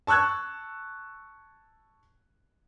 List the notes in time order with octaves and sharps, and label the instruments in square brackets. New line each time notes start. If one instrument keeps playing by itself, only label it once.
[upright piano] A5 C#6 E6 F#6 G#6